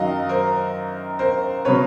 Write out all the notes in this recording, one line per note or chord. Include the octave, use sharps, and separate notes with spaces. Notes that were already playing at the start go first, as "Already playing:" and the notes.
Already playing: F#2 D#3 F#3 D#5 F5
A#4 C5
A#4 C5
C#3 F#3 B4 C#5